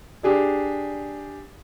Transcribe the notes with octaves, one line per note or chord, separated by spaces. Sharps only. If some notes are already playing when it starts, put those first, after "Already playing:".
D4 G4 G#4 D5